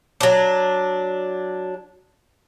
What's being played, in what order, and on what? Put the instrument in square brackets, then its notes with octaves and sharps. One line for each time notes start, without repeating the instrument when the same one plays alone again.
[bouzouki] F#3 D4